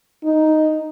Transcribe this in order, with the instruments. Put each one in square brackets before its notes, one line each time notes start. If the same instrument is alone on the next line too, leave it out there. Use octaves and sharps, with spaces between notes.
[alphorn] D#4